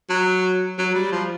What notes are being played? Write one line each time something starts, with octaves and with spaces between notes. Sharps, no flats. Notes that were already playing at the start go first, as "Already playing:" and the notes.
F#3
F#3
G3
F3